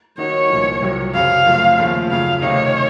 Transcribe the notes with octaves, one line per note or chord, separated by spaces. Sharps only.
D#3 A#3 D#4 F#4 C#5
C2 A#2 F3
C2 C3 F#3
F#2 C#3 F#3 C4 F5
F#2 F3 A3
D#2 C#3 F3 A3
F#2 C#3 F#3 F5
C3 D#3 A3 D#4 C#5